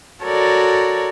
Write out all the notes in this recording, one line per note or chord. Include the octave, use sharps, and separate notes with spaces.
F#4 A4 A#4 C#5 D5